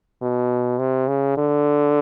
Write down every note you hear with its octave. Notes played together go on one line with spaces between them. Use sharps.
B2
C3
C#3
D3